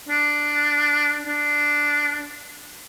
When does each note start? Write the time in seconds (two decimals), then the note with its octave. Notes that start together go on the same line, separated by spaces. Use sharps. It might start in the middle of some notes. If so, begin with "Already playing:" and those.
0.09 D4
1.27 D4